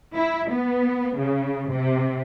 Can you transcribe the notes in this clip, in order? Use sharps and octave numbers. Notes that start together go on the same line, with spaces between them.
E4
B3
C#3
C3